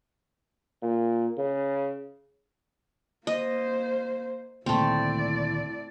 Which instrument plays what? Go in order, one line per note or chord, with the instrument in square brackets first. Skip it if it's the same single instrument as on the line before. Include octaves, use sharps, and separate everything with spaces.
[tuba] A#2
C#3
[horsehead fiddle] A#3 C5 [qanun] D#5
[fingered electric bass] D2 A#2 D#3 [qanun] A3 C4 [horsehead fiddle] E4 D5